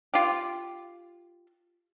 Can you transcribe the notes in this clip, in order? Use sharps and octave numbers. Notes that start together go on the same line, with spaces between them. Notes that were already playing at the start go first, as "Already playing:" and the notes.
F4 G4